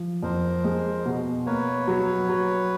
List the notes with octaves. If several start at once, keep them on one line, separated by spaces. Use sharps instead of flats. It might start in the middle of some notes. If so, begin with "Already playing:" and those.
Already playing: F3
F2 A#4 C5
G#3
B2
A#3 B4 C#5
F#3
F#3